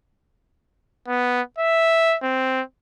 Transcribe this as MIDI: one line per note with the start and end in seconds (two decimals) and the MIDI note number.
1.08 1.41 59
1.58 2.16 76
2.23 2.62 60